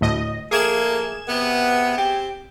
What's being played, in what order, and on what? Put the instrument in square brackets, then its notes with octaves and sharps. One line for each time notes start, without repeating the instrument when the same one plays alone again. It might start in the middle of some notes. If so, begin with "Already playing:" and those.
[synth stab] D2 A2 D#5
[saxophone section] F3 A3 A#3 [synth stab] G#4 G#6 E7
[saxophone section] C3 B3
C4 G4